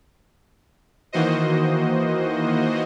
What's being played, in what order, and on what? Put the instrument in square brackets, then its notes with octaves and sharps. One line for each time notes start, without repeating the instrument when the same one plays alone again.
[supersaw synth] D#3 E3 A#3 F#4 C5 D#5